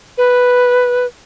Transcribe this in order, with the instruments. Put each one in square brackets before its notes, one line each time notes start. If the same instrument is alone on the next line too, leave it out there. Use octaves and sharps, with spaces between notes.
[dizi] B4